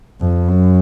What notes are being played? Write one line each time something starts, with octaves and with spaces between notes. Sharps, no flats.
F2
F#2